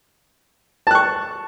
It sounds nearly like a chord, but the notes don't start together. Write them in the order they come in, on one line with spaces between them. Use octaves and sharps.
A5 F#6 C#6